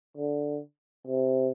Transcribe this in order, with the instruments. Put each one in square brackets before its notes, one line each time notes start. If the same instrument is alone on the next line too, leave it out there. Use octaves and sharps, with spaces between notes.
[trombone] D3
C3